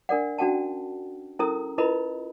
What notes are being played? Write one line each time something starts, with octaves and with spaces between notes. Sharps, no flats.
D4 A#4 D5 F#5
C#4 D4 F#4 F#5 G5 A5
C#4 E4 A4 A#4 A#5 D#6
E4 F4 A#4 B4 D#5 B5